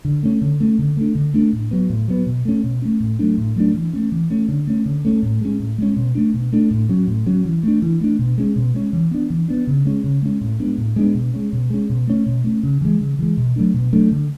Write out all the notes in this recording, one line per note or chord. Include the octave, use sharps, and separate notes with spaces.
D3
A3 C#4
D3
A3 C#4
D3
A3 D4
D3
A3 D4
A2
F#3 B3
A2
F#3 B3
B2
A3 C#4
B2
A3 C#4
A2
F#3 A3 D4
A2
F#3 A3 D4
E3
A3 C#4
E3
A3 C#4
D3
A3 C#4
D3
A3 C#4
A2
G#3 C#4
A2
G#3 C#4
B2
A3 D4
B2
A3 D4
A2
F#3 C#4
A2
F#3 C#4
E3
A3 D4
E3
A3 D4
B2
G#3 C#4
B2
G#3 C#4
E3
B3 D4
E3
B3 D4
C#3
G#3 C#4
C#3
G#3 C#4
A2
G#3 B3 D4
A2
G#3 B3 D4
B2
G#3 C#4
B2
G#3 C#4
B2
A3 C#4
B2
A3 C#4
C#3
E3 G#3
C#3
E3 G#3
B2
F#3 A3 D4
B2
F#3 A3 D4
D3